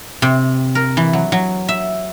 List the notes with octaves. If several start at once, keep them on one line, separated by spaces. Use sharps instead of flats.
C3
A#4
E3
F#3
F#3
E5